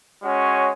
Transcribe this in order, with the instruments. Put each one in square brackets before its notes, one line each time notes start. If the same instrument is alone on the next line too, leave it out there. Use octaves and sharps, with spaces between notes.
[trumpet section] G#3 C#4 F#4 C#5